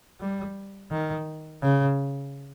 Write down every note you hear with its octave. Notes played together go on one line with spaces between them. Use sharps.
G3
D#3
C#3